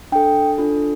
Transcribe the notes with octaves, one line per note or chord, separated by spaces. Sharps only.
D4 A4 G5
D4 F4 A4